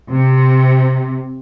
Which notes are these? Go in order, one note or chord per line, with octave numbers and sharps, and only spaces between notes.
C3